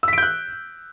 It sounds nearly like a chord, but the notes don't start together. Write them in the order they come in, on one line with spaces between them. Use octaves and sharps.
E6 B6 D7 G6 F#6